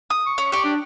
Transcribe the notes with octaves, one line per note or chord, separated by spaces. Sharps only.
D#6
C#6
C#4
G4 D5 C#6
D4